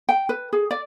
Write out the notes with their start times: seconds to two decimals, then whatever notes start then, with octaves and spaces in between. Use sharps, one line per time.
0.09 G5
0.29 B4
0.53 G#4
0.71 D5